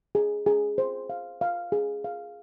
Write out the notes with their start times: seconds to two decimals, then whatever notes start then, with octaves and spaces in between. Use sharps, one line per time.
0.15 G#4
0.46 G#4
0.78 C5
1.10 F5
1.41 F5
1.72 G#4
2.04 F5